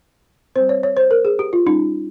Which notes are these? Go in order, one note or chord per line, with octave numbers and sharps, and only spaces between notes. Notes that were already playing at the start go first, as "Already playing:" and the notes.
G3 C4 C5
C#5
C#5
C5
A#4
G#4
G4
F4
G3 C#4 D#4